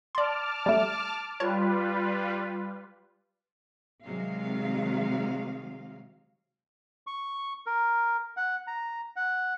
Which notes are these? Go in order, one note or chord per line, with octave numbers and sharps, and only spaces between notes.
D5 A5 C6 D6 F6
G3 A3
G3 F4 B4 C#5 A5
C3 D#3 F#3 G#3 F5
C#6
A#4
F#5
A#5
F#5